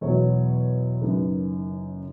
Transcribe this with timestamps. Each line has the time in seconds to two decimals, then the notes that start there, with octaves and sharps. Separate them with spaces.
0.01 E2 B2 F#3 B3 C#5
1.01 F#1 F#2 D#3 B4